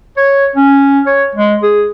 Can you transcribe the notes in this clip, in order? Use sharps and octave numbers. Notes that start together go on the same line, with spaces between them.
C#5
C#4
C#5
G#3
G#4